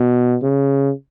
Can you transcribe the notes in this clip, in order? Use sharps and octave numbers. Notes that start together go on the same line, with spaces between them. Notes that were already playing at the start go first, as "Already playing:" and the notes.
Already playing: B2
C#3